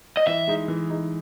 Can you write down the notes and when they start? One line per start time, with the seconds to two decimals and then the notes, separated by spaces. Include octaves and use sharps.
0.17 D#5
0.27 E3 E5
0.47 G#3 D#4
0.68 E3
0.89 G#3 D#4